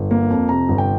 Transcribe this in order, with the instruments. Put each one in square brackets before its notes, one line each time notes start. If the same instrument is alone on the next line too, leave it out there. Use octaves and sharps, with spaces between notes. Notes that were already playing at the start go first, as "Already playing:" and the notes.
Already playing: [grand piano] G1
A#3
F2
C3 A#5
G1
G5